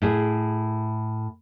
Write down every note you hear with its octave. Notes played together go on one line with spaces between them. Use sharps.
A2 E4 G#4